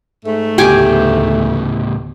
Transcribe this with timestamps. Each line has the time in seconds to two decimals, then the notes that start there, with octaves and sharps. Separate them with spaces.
0.24 G#2 A3
0.58 D2 A2 C#3 B3 G4 G#5 D6